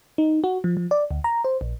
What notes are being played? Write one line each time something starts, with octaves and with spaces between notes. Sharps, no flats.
D#4
F#4
F3
F3
D5
D2
A#5
C5
A#1